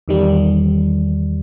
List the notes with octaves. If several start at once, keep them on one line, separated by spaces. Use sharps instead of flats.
E2 D#3 G3